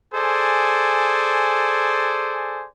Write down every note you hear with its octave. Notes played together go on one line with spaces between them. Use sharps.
G#4 A4 C5 D5 G#5